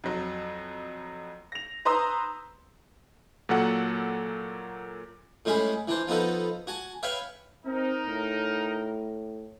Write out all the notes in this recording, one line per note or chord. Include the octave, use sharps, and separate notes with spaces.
F2 F#3
A#6 F7
B4 C5 A#5 C6 D#6 E6
A#2 F#3 A#3 A4 F#5
A2 G3 G#3 C#4 G#4 B5
E3 D4 C5
F3 B3 D#4 A4 B4
F#4 G#5 A5
B4 C#5 E5 F5 G5
C4 D#4 A#4
A2